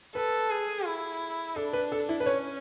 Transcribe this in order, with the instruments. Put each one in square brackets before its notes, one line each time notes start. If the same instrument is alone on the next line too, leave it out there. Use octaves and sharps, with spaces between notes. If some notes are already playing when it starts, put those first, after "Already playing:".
[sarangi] A4 [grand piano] B4
[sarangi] G#4
E4
[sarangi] D4 [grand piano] A4
[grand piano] B4
A4
E4
B4
[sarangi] C#4 [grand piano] C#5